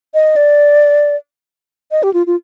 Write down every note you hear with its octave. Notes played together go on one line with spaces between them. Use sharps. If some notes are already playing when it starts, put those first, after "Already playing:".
D#5
D5
D#5
G4
F4
F4